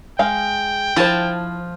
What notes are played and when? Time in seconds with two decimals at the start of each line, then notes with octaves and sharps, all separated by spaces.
0.19 G#3 F5 G5
0.96 F3 E4 C5 G#5 A5